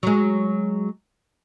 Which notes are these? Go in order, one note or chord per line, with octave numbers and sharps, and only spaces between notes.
F#3 G#3